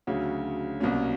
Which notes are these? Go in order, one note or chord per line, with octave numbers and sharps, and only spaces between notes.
D2 C#3 F#3
C2 B2 F#3 A#3 C#4